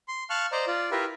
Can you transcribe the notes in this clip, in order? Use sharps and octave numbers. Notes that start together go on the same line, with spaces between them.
C6
F5 A5 C#6 F6 F#6
C5 D5 D#5 A#5
F4 D5
E4 F4 G4 A#4 B4 E5